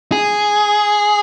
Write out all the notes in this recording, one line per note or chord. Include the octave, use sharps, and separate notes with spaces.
G#4